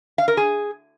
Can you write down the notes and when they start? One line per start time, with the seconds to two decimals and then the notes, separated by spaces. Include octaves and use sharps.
0.18 F5
0.28 A#4
0.37 G#4